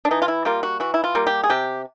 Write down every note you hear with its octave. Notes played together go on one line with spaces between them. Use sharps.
D4
E3 D#4
F4
E4
G3 A#3 F4
F#4
E3 F#4
E4
F4
G3 A#3
G4
G#4
C3 G4